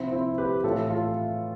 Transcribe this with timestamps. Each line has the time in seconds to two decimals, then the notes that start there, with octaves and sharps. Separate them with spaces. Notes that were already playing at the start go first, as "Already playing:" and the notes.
Already playing: C3 F3 C4 E4
0.12 C4 E4
0.38 G4 B4
0.63 A2 E3 F4 A4
0.90 F4 A4